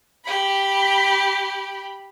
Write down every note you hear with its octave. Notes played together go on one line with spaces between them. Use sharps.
G4 B5